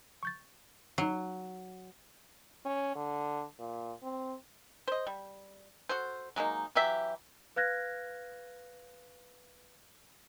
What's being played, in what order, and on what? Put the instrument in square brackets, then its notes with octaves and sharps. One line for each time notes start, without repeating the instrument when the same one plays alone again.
[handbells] C#6 G6 A6
[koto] F#3 [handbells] D#4 C7
[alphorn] C#4
D3
A#2
C4
[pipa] C5 D#5
G3
F#4 A4 C5
F#3 G#3 A#3 D#4
E3 F#3 G4 E5
[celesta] B4 F5 F6 F#6 G#6 A#6